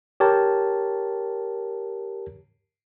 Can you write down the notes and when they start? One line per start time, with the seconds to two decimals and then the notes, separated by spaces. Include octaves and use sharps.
0.20 G4 A#4 C#5 A5